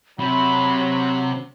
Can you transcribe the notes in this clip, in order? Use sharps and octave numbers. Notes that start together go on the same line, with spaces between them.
C3 F#3 B5